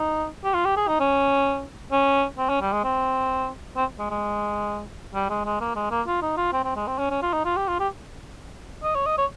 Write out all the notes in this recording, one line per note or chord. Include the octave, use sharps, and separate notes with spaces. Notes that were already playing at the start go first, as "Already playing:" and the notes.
Already playing: D#4
G4
F4
G4
G#4
D#4
C#4
C#4
C4
C#4
G3
G#3
C4
C4
G#3
G#3
G3
G#3
G#3
A#3
G#3
A#3
F4
D#4
F4
C4
C4
G#3
C4
C#4
C#4
F4
D#4
F4
G4
F4
G4
D#5
C#5
D#5
C#5